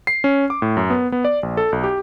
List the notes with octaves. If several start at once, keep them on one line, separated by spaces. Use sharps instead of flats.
C7
C#4
D6
A2
F#2
B3
B3
D5
A#1
A4
B1
G4